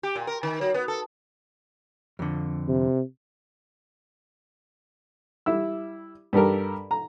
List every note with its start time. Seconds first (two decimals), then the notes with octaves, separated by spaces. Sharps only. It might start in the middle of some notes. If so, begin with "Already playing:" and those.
0.03 G4
0.15 A#2
0.27 A#4
0.43 D#3
0.61 F#3
0.74 B3
0.88 A4
2.19 F2 D3
2.68 C3
5.46 G3 E4 E6
6.33 G2 G4 A4 A#4
6.91 A#5